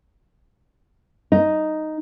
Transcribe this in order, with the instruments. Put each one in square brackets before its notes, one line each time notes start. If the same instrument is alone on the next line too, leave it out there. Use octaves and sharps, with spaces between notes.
[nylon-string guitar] D#4